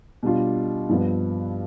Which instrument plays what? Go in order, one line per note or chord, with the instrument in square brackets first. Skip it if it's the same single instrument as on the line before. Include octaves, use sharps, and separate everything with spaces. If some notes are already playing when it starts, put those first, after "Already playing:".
[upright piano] B2 G3 D4 F4
G2 F3 B3